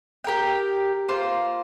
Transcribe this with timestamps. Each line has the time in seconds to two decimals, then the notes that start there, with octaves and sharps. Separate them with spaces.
0.24 G4 A#4 G5
1.08 A#3 F4 C5